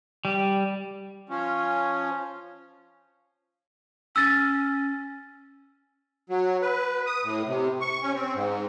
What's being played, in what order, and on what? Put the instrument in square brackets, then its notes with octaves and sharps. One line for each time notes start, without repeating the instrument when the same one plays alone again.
[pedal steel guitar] G3
[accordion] F3 C#4
[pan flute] C#4 [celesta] E6 A6
[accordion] F#3
B4
D#6
A2
C3
C#6
C#4
C4
G#2